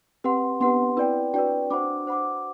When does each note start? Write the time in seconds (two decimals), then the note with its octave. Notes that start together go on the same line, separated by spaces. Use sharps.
0.24 C4 G4 B4 F#5 C6
0.60 B3 D4 G4 B4 F#5 C6
0.97 C4 E4 B4 D5 G5
1.34 D4 F#4 B4 D5 G5
1.70 D4 F#4 C5 F#5 B5 D6
2.07 C5 F#5 B5 D6